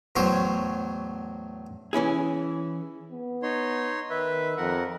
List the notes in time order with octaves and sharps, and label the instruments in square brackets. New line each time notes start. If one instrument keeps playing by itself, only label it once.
[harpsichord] E2 A2 F#3 C5 C#5
[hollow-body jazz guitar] E3 C#4 E4 G#4
[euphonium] B3
[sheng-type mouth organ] D#4 C#5 C6
[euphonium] D#3 [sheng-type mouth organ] B4 E5
[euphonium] F2 [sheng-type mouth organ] A#4 F#5